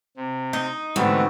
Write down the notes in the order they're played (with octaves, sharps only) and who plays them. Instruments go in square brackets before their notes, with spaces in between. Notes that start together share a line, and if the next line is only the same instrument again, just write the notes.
[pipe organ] C3
[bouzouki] D#4
[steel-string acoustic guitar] G#2 [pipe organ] D3 E3 A3 [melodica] B3 C4 F#4